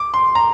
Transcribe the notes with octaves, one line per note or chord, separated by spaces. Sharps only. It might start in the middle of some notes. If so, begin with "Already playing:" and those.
Already playing: D6
C6
A#5